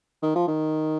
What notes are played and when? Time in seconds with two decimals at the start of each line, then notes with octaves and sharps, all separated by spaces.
0.22 D#3
0.35 F3
0.48 D#3